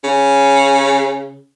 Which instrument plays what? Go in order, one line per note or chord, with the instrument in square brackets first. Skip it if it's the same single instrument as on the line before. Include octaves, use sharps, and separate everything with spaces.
[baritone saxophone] C#3